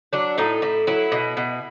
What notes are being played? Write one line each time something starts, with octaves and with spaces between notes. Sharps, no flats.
F#3 D4
A2 D#4
A2 E4
F#3 E4
B2
B2